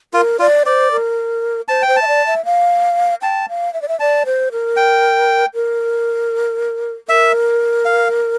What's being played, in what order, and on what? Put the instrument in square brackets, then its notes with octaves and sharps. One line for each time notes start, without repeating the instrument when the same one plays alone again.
[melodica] F4 [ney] A#4
[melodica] F4 [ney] D5
[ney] C5 [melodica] D5
[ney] A#4
[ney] C5 [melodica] A5
[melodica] G5
[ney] C5
[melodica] A5
[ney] E5
D5
E5
F5
[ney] G5 [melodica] A5
[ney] F5
E5
D5
E5
[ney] D5 [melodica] A5
[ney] C5
A#4
[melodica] G5
[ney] A#4
[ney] A#4 [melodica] E5
[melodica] F5